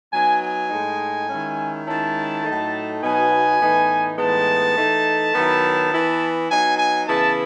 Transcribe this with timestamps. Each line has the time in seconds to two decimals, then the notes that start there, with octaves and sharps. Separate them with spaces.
0.12 F#3 B3 D#4 G#5
0.41 G#5
0.70 A2 G#3 D#4
1.28 D#3 G#3 C#4 E4
1.86 D#3 G#3 C#4 E4 A5
2.44 A2 F#3 A3 D#4
3.01 B2 F#3 B3 D#4 G#5
3.59 A2 E3 B3 D#4
4.17 A2 E3 G#3 B3 D#4 A5
4.75 E3 A3 D#4
5.32 D#3 F#3 B3 E4
5.91 E3 B3 E4
6.48 F#3 B3 D#4 G#5
6.76 G#5
7.06 C#3 E3 B3 E4 A5